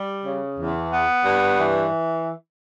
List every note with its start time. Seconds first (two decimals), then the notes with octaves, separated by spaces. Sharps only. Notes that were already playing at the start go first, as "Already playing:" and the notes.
Already playing: G3
0.24 C#3
0.58 E2
0.92 B3
1.24 G2
1.57 E3